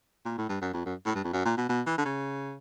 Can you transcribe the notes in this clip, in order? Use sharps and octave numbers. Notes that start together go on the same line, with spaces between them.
A#2
A2
G2
F#2
F2
F#2
A2
G2
F2
F#2
A#2
B2
B2
E3
D3
C#3